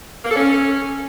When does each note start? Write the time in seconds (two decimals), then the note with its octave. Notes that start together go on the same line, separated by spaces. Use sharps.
0.25 A#3
0.30 A4
0.36 C#4